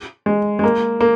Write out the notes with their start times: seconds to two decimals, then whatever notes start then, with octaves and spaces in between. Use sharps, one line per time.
0.26 G#3
0.59 G#3
0.64 A#3
1.01 A#3